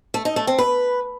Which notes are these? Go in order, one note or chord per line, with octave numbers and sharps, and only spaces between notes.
A3
D#4
A3
C4
B4